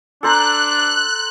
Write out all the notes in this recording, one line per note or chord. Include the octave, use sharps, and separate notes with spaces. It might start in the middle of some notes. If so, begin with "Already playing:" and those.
D4 A4 C5 A#5 F#6